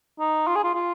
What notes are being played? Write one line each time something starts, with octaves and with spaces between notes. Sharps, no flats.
D#4
F4
G#4
F4
F4